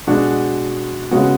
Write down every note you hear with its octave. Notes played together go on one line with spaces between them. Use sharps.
B2 G#3 D4 F#4
C#3 G#3 B3 F#4